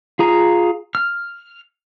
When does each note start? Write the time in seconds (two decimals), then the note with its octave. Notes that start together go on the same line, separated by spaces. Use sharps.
0.19 F4 G#4 A#5
0.95 F6